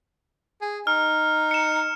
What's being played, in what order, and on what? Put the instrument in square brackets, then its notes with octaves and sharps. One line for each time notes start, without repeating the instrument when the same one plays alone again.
[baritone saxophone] G#4
[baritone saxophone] D#4 [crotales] F6
[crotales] C#7 E7